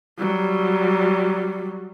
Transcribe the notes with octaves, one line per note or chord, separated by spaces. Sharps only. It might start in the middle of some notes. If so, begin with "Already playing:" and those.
F#3 G3